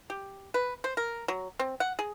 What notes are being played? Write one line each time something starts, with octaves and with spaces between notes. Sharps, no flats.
G4
B4
C5
A#4
F#3
C4
F#5
G#4